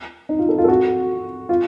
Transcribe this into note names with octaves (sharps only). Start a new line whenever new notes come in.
D#4
F4
A4
F4
A4
F#4
F4